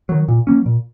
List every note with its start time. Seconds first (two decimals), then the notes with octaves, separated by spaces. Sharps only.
0.09 D#3 F#3
0.28 A#2
0.47 F#3 A#3 C#4
0.66 A#2